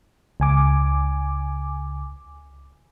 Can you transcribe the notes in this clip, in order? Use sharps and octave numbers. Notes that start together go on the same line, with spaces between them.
C#2 G#5 D6